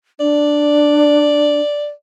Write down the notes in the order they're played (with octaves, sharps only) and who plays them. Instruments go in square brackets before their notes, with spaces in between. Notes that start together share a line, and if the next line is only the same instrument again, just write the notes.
[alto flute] D4 [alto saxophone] D5